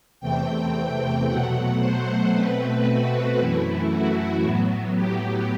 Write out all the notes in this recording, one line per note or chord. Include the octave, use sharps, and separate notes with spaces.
E2 C3 E3 A3 C4 G5
B2 F#3 A3 F#5
C5
B2 A3 C4 B4
F#4
F#2 E3 A3 E4
F#4
A2 F#3 B3
G4